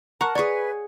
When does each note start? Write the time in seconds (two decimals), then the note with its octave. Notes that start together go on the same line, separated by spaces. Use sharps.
0.21 A#4 F#5 A5 A#5 C#6 F#6
0.35 G#4 B4 C#5 D5 C#6